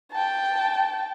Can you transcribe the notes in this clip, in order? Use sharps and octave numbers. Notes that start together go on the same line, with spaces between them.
G5 A5